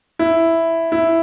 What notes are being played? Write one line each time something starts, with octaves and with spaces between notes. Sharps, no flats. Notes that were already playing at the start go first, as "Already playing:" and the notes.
E4
E4